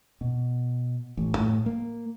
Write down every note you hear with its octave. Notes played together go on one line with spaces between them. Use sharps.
B2
A1
A2
A#3